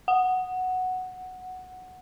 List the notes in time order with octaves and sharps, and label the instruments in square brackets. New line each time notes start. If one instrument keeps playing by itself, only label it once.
[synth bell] F#5